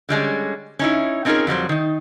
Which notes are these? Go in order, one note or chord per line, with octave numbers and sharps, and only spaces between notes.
D3 G3 G#3 C#4
C#4 D#4 E4
C4 C#4 D#4 F4 G#4 A#4
F2 F#3 G3 C5
D#3 D#4